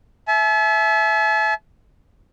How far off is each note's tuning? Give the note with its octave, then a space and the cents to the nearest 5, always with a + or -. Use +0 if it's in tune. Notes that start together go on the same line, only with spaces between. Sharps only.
E5 +0 A5 -45